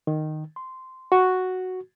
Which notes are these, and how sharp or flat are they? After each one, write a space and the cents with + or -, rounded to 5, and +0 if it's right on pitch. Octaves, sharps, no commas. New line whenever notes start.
D#3 -10
C6 -10
F#4 +0